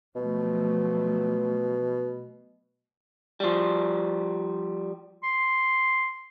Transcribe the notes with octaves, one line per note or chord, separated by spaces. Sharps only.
B2 F3 F#3 A3
F3 G3
C6